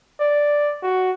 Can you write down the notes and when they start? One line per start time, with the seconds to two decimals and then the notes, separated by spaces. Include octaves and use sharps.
0.20 D5
0.83 F#4